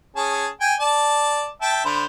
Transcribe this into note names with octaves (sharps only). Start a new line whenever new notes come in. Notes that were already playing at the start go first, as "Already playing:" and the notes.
C#4 G#4 A5
G5 G#5
D5 A5
E5 G5 A5
D3 C5 B5